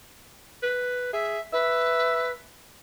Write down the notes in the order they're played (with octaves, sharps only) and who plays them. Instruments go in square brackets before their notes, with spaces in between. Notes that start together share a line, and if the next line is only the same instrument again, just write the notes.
[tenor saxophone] B4
[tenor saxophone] G#4 [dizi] E5
[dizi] B4 [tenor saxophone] E5